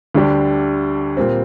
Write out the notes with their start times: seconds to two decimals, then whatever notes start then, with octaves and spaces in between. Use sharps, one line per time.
0.15 D2 D3 G3 D4 G4
1.17 A#2 G3 C4